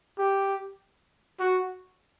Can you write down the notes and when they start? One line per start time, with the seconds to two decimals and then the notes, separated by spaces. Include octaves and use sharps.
0.18 G4
1.39 F#4